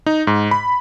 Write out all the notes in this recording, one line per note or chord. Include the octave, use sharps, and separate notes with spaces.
D#4
G#2
B5